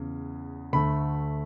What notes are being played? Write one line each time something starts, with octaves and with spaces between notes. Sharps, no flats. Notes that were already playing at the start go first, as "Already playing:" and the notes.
Already playing: E2 C#3
D2 D3 A3 B5